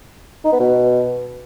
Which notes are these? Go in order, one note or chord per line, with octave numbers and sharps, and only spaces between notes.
D#4
B3
B2